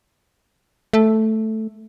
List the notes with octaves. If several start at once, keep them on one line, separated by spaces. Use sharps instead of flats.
A3